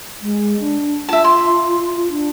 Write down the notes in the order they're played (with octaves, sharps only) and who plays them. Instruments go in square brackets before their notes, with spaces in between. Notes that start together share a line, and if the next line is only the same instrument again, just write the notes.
[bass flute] G#3
D4
[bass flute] F4 [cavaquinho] E5 A5
[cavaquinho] C6
[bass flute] D4